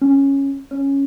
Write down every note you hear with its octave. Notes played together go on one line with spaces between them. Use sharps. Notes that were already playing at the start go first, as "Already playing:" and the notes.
C#4
C#4